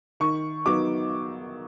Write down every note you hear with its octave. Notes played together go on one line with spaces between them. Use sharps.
D#3 C#6
F#3 B3 D#4 D6